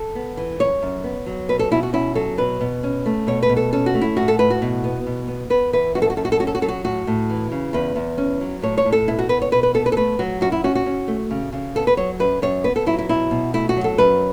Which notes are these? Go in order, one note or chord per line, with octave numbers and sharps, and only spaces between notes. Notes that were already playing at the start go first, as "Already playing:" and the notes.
Already playing: A4
B3
E3
F#2 C#5
F#2
B3
F#3
B2 B4
A4
B2 E4
F#4
C#4 E4
F#3 A4
B2 B4
B2
C#4
A3
B2 C#5
B4
B2
A4
C#4 A4
F#4
A3
E4
A2 F#4
A4
A2 B4
F#4
B2
B3
B2
B3
B3 B4
E3 B4
F#2 F#4
A4
F#4
F#2 A4
F#4
A4
C#4 F#4
A4
F#4
F#3 A4
F#4
A2 F#4
A2
E3
C#3
E2 B4
E2
C#4
F#3
A2 C#5
C#5
A2
A4
B2 E4
F#4
B3 B4
C#5
B2 B4
B4
B3 A4
B4
A4
A3 B4
F#3 F#4
F#2 F#4
E4
C#4 F#4
F#4
C#4
A3
C#3
C#3
B3 A4
B4
F#3 C#5
F#2 B4
F#2 C#5
B3 B4
A4
F#3 E4
E4
B2 E4
B2
A3 E4
F#4
F#3
A4
F#2 B4